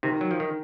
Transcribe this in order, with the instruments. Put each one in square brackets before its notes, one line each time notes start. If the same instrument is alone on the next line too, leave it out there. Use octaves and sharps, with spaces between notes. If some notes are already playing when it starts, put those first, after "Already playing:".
[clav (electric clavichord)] C3 [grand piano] D#3
[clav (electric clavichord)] F#3
F3
D#3